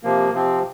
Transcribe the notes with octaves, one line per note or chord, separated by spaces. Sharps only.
C3 F3 A#3
C3 F3 C4